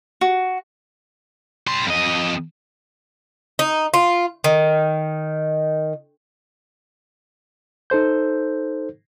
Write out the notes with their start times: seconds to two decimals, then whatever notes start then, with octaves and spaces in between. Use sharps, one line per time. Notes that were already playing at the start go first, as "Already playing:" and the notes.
0.21 F#4
1.67 G3 C6
1.87 F2 D#5
3.59 D#4
3.94 F4
4.44 D#3
7.90 D#4 A4 C5 G6